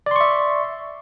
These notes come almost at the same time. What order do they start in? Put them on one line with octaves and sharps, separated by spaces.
D5 C6 C#6 E5